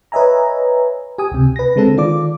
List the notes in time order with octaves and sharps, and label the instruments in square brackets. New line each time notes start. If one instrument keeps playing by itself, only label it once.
[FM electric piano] B4 C#5 D#5 E5 G#5 A#5
G4 G#5 D#6
C#2 C3
B4 A#6
D3 G#3 C4 A4
D#3 F4 D5 D6